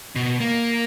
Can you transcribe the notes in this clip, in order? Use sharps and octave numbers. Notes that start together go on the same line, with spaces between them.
B2
A#3